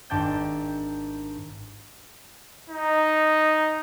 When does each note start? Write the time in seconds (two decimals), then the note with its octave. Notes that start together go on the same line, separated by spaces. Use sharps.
0.10 G#1 G#2 D4 G5 A5 G6
2.70 D#4